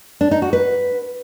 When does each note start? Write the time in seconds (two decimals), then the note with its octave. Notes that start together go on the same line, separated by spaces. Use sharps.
0.21 D4
0.31 D#4
0.42 F#4
0.53 B4